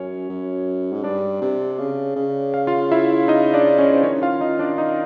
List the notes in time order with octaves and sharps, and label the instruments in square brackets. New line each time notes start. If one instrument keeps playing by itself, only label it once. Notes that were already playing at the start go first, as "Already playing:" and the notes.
Already playing: [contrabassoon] F#2 [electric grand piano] C#4 C#5
[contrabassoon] F#2
G#2
[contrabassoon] G2 [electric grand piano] D4 D5
[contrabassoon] C3
C#3
C#3
[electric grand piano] F5
F4 F5
E4 E5
D#4 D#5
D4 D5
C#4 C#5
C5
[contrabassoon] D#3 [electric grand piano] C#4 C#5
[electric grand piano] F4 F5
D#4 D#5
D4 D5
D#4 D#5